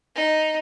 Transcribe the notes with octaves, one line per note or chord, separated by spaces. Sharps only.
D#4